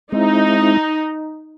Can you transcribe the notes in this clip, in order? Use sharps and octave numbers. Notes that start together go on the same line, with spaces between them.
G#3 C4 D#4 E4